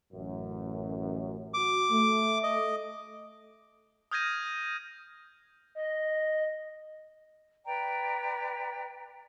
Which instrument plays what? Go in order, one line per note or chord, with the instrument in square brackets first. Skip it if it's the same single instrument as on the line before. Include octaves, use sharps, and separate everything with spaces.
[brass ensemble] A1 F#2
[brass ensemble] F#4 [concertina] D6
[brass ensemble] A3
[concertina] D#5
[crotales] D#6 F6 G6 G#6 A#6 D#7
[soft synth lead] D#5
[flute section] B4 D5 G5 A#5